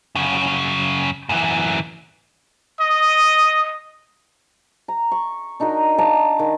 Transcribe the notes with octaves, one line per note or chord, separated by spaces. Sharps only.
F#2 C#3
F#2 E3
D#5 D#6
A#5
C#6
D4 D#4 F#4 A#4
D5 F5 A5 A#5
D#3